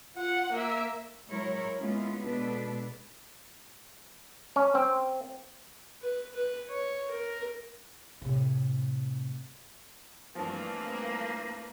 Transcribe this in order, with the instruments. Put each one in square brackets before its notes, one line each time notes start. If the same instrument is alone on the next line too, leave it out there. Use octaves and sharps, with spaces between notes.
[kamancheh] F4 F#5
A#3 E5
[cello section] F#3 G#3 E4 A#4 C#5
G#3 A#3 B3 C#4 E4 F4
B2 G#3 D4 A4 B4
[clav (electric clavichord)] C#4
C4
[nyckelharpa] B4
B4
C#5
A#4
[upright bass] A2 C3
[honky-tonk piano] G2 F3 [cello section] E3 A3 C4 [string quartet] A#3 B4